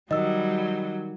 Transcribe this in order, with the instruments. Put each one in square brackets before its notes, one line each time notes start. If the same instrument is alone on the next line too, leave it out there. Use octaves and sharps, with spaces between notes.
[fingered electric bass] D#3 [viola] F#3 [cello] G3 [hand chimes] D#5 E6